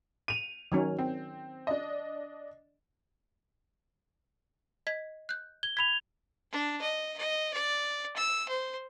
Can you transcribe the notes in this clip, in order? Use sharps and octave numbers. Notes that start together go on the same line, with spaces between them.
D#7 F7
D#3 F#3 C#4
C4
D4 D#5
D#5 G#6 B6
F#6 G6
G#6 G7
B5 G#6 B6 F7
D4
D#5
D#5
D5
E6
C5